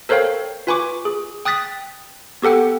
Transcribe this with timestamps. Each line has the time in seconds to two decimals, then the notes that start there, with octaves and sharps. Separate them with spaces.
0.09 A4 A#4 C5 C#5 F5 G5
0.67 F4 B4 G#5 B5 C#6 D6
1.05 G#4
1.45 G5 D#6 F#6 A6 B6
2.42 B3 G4 A4 F#5 G5